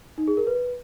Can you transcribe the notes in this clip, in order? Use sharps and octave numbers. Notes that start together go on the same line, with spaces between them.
D#4
G#4
A#4
B4